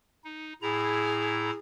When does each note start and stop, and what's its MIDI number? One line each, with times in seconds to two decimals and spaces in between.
0.24 0.53 63
0.62 1.51 45
0.62 1.51 64
0.62 1.59 68
0.62 1.51 82